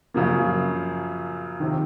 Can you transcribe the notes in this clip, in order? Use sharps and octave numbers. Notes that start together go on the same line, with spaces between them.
F#2 C#3 F3 A#3
C3 D#3